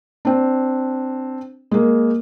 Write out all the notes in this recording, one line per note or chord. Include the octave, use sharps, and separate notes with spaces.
C4 D4
G#3 A#3